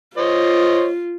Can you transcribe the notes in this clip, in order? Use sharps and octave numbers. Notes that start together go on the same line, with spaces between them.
F4 C5 C#5 D#5